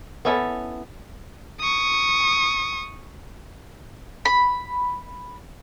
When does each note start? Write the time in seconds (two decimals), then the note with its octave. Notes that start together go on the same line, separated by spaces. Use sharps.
0.25 B3 C#4 E4 A4
1.60 C#6 D#6
4.25 B5